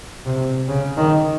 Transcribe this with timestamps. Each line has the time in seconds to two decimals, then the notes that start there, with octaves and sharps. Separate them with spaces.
0.26 C3
0.68 C#3
0.97 D#3